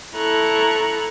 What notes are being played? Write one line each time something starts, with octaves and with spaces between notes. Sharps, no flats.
E4 A4 A#5 C#6 F#6